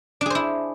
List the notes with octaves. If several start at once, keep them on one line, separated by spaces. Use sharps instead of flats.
D4 E4 G#4 C5